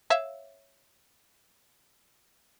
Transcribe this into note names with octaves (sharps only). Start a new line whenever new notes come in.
C#5 E5 F5